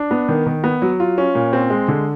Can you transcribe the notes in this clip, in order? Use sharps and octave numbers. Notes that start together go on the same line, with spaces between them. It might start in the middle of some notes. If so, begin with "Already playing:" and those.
Already playing: D4
B3
D#3
D#3
B3
F#3
F4
C#4
A#2
C4
G#3
D3